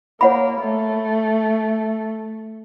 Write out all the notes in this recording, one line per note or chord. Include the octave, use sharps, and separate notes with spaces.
A#3 C#5 F#5 B5
A3